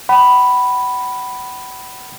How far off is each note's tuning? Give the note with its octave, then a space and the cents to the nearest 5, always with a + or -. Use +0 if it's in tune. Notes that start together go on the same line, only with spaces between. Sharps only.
F#5 +40 B5 +0